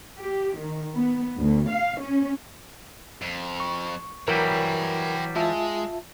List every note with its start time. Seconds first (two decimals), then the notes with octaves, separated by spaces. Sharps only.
0.19 G4
0.57 D#3
0.94 B3
1.38 D2
1.70 F5
2.02 C#4
3.22 F2
3.60 C#6
4.28 E3 F#3 G3 A#4 C#5 G5
5.36 G#3 F4 E5 A5